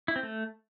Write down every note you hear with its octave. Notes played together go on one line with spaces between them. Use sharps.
E4
C4
A3